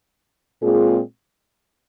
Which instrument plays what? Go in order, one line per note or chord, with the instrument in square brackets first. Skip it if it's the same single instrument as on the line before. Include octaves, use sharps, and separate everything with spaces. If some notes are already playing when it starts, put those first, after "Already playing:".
[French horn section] A#2 G#3 C4 F4 G#4